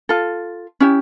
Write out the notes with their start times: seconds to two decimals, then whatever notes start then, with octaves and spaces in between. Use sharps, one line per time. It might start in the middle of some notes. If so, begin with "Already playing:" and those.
0.09 F4 A4
0.80 C#4 E4 G4